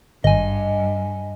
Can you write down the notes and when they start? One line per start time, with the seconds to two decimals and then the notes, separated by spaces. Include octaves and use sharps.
0.24 G#1 G2 D#5 G#5